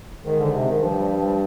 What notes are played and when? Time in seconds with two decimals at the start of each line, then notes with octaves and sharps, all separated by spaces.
0.24 G#2 D#3
0.39 D3
0.53 C3
0.68 D#3
0.82 G2 F3
0.97 G3
1.11 F3
1.26 G3